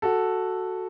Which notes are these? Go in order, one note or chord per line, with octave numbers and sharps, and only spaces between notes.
F#4 A4